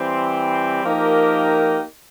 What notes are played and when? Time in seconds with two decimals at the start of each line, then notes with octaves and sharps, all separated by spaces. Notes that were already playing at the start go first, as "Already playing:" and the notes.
Already playing: E3 G3 C4
0.84 F3 A#3 D#4 G4 A#4